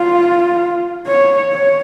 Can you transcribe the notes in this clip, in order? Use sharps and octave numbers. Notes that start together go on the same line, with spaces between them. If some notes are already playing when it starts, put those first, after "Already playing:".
Already playing: F4
C#5
C#5